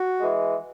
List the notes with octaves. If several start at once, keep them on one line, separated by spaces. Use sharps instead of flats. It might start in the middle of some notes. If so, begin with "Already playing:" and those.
Already playing: F#4
E3 G#3